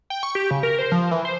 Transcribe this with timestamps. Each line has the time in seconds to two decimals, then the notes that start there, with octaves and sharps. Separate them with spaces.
0.10 G5
0.23 C#6
0.35 G4
0.51 C#3
0.63 A#4
0.79 C5
0.92 F3
1.11 E3
1.25 C5